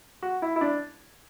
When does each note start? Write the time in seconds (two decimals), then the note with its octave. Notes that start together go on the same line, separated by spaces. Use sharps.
0.22 F#4
0.42 E4
0.56 E4
0.61 D4